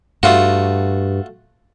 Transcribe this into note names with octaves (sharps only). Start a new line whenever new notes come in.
G2 A3 F4 F#4